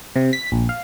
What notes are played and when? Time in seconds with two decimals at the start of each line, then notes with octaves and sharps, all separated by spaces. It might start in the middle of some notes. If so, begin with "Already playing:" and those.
0.16 C3
0.33 B6
0.52 A#1
0.69 F5